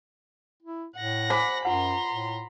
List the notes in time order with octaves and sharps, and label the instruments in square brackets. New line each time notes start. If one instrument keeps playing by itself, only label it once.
[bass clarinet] E4
[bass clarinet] A2 [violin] F#5 A#6
[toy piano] C5 G#5 D6 [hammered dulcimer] B5
[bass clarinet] F#2 [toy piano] F4 F#5 [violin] A#5 C6
[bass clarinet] A2